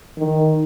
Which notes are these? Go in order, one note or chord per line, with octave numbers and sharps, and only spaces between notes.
D#3